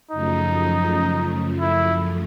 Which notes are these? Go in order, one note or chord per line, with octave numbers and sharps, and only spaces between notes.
F#2 C#3 F3 A3 D#4
E4